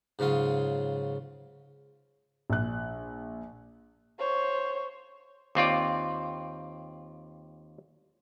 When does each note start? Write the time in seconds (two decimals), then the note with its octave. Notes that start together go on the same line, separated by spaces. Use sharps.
0.19 G#2 C#3 F#3 F4 D#6
2.50 A#1 F#6
4.19 C5 C#5
5.55 D#2 C4 F4 D5